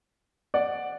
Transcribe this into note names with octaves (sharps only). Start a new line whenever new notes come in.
D5 F#5